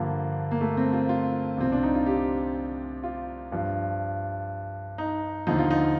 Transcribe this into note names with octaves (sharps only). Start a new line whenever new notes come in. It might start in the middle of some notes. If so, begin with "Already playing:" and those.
Already playing: G2 D3 F3 A#3
A#3
A3
C4
F4
F4
C2 C3 F3 C4
D4
D#4
F4
G4
F4
G2 F3
D#4
D#2 D3 F3 D#4
F4
D#4